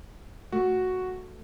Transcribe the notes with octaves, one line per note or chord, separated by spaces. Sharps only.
A3 F#4